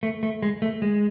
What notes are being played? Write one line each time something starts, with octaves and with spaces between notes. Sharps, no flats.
A3
A3
G#3
A3
G#3